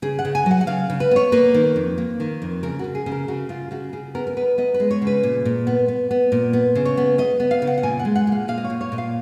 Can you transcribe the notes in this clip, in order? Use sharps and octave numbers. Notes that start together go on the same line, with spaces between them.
C#3 G#4
F#5
C#3
G#5
F#3 F#5
F#5
C#3 F5
C#3
B4
B3 C#5
A#3 B4
D#3
F2
A#3
D#3
F2
C#3 A#4
C#3 F#4
G#4
C#3
A#4
C#3 F#4
C#3 F4
C#3 F#4
C#3 G#4
B3 A#4
A#4
B3 B4
B3 D#5
B4
G#3
C#5
C#3
B4
A#2
A#2
B3
B3
B3
A#2
B3
C#3
C#5
B3
B3 D#5
B3
F5
C#3
F#5
F#5
A#2 G#5
F#5
G#3
F#5
A#2 F5
A#2 F5
D#5
C#5
A#2
C#5
A#2 D#5
F5